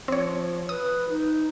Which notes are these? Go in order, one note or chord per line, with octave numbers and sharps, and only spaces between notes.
F3 C4 C#5
B4 D#6
D#4